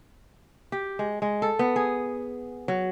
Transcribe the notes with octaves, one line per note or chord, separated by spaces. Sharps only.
G4
G#3
G#3
A4
B3
G#4
F#3